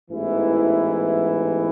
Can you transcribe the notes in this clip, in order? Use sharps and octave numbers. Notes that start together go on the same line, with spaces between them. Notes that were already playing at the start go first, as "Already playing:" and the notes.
A1 G#2 E3 B3 E4